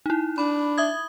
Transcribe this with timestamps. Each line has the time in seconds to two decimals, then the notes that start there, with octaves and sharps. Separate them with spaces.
0.06 D#4 E4
0.38 D4 B5
0.78 E5 D#6 G#6